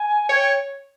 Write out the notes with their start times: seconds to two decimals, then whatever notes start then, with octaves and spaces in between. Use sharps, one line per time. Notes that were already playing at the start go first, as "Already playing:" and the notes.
Already playing: G#5
0.29 C#5 G5